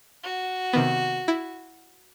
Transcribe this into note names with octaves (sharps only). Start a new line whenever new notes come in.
F#4
C3 D#3 B3
E4